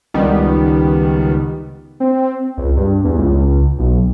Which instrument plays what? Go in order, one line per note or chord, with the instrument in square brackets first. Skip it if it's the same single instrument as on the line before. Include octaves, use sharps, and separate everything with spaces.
[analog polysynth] C#2 D#3 G3 B3
[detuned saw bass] C4
C#2
G2
E2
C#2
B1